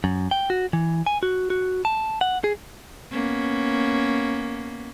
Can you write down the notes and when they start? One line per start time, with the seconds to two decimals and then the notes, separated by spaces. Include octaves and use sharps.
0.04 F#2
0.31 G5
0.50 F#4
0.73 E3
1.06 G#5
1.23 F#4
1.50 F#4
1.85 A5
2.21 F#5
2.44 G#4
3.11 A#3 B3 C#4